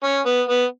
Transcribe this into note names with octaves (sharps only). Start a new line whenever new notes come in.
C#4
B3
B3